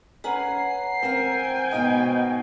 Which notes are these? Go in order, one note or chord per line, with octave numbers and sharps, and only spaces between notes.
C#4 B4 F#5 G#5 A#5 C7
C4 A#4 F5 G5 G#5
G#2 B2 D#4 F5